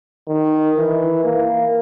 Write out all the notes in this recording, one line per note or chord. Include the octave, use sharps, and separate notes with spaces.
D#3
E3
A#3